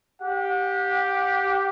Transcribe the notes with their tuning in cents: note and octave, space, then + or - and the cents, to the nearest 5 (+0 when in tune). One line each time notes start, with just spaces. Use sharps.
G4 +0 F#5 -35